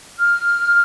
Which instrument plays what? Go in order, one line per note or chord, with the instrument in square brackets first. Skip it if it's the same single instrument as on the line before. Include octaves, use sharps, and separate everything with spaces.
[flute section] F6